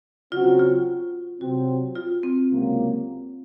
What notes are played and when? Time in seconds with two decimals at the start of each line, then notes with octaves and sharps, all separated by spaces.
0.32 C#3 F#3 C4 F4 F#4
0.59 F4
1.41 C3 F#3 C4 F#4
1.95 F4
2.23 C4
2.50 C#2 C3 F#3 A#3